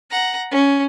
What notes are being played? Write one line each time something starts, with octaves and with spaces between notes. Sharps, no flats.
F#5 A#5
C#4